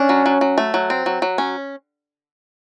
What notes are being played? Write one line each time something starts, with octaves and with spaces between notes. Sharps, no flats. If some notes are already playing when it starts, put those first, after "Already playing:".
Already playing: C#4 D4
F#3
F#3
F#3
A3
F#3
C4
F#3
F#3
C#4